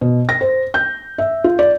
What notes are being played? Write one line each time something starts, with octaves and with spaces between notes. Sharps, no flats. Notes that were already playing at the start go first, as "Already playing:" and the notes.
B2
A#6
C5
G6
E5
F4
D5